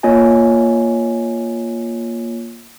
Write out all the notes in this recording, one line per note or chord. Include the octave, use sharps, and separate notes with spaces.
A#3 F4 C#5 D#5 G#5